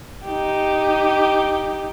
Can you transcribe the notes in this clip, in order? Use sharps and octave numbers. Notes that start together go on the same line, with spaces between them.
D#4 G4